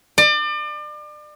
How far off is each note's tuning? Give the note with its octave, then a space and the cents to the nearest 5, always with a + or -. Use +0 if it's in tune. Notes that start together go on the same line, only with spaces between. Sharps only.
D5 +35